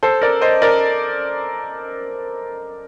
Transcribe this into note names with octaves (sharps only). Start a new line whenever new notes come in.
A4 C5
A#4 D5
C5 D#5
A#4 D5